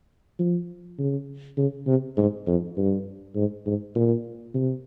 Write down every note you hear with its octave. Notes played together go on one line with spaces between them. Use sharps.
F3
C#3
C#3
C3
G#2
F2
G2
G#2
G#2
A#2
C3